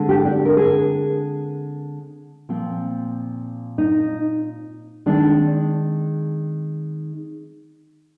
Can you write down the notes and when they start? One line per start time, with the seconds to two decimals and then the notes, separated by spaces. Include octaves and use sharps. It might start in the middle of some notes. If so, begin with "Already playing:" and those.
Already playing: D3 G#3 C4
0.09 G4
0.25 D4
0.45 A#4
0.57 G#4
2.49 A#2 F3 C4
3.78 D#4
5.06 D#3 G#3 C4 D4